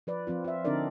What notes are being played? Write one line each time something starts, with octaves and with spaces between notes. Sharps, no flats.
F3 B4 D5
F3 C4 F4
F4 E5
D3 C4 D4 D#4 A#4 D5